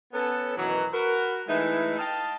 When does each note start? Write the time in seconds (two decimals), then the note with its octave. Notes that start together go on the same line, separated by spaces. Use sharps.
0.13 B3 C#4 A4
0.56 F#2 B2 D#3 E3 F#3
0.92 F#4 A#4 B4
1.48 E3 G#3 A3 D#4 E4
1.99 D#5 F5 G5 A5